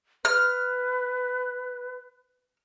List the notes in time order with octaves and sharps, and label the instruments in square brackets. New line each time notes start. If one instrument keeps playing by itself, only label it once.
[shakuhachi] B4 [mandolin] F6